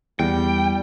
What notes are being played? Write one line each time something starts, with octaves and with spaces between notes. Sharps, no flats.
E2 G3 G5